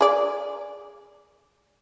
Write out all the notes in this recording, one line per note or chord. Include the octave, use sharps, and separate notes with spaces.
G#4 D5